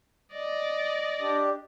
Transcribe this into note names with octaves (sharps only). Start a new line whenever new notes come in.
D5 D#5
D4 G4